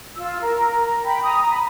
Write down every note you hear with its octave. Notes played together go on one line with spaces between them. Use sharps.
F4 E6
A#4
A#5
G5 B5
A#5 D#6
B5